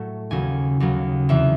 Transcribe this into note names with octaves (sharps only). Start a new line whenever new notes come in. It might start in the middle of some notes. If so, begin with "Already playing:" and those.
Already playing: A2 F#3 A3
D#2 C#3 F#3 G#5
D#2 C#3 F#3
E2 C3 E3 E5